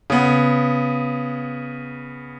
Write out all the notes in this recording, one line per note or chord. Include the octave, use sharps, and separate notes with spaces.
C#3 B3